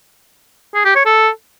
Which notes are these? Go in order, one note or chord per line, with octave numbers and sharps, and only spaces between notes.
G#4
G4
C#5
A4